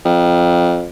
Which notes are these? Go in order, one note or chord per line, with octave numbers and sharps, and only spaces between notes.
F2